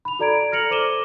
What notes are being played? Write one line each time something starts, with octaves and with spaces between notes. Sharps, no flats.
B5 F7
F#4 A4 D5 A#5 G#6 D7
F6 A#6 C#7 F7 F#7
A4 C5 D6 D#7 E7 G7